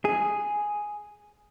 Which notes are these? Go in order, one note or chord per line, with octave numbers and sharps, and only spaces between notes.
G#4